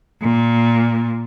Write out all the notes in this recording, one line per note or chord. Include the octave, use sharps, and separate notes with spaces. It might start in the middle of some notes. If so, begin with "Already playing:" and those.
A#2